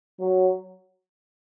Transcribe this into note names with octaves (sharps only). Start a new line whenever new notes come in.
F#3